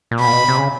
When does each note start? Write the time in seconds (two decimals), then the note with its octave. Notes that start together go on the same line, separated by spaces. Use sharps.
0.11 A#2
0.20 B2 B5
0.27 A#2
0.33 B2
0.48 C3
0.58 C#3